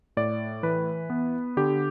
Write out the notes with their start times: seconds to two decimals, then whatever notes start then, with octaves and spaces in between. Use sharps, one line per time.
0.17 A2 D5
0.63 E3 B4
1.10 B3
1.57 D3 G4